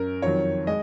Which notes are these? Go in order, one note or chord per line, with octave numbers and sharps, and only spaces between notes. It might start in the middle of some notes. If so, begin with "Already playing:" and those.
Already playing: F#2 A#4
F2 D#3 F#3 C#5
G#3 D#5